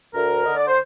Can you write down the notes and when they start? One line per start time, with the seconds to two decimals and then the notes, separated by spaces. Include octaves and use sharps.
0.15 D2 A#4
0.45 D3 D#5
0.57 D5
0.68 C5